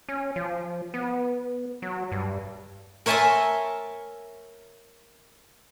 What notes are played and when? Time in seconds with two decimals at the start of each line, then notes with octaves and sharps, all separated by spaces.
0.09 C#4
0.36 F3
0.94 B3
1.82 F#3
2.12 G2
3.06 A#4 C#5 E5 G#5 A5 C6